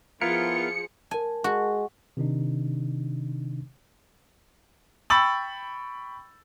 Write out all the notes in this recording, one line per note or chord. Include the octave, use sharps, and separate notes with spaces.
F3 B3 E4 F4 G#4 A#4 C#7
A#4 G#5 A5
G#3 F#4
C3 D#3 D4 D#4
G5 B5 C#6 E6 A6 F#7